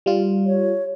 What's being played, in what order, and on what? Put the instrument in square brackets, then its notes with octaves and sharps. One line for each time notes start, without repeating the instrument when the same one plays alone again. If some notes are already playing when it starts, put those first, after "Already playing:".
[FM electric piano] G3 F4
[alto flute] C#5